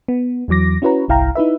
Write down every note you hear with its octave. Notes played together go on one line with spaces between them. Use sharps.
B3
E2 E3 F#3 D6 A#6
C#4 E4 F#4 B4 C#5 A#5
G1 C2 E4 F5 G5 A#5
D#4 E4 B4 E5